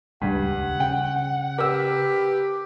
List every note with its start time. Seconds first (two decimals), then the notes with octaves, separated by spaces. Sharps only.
0.22 D#1 C#2 G2 G3 F#5
0.80 C#3 G5
1.59 G4 A#4 B4 E6